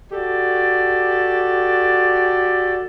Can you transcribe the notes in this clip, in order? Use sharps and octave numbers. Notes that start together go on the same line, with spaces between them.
F#4 G4 A4 D5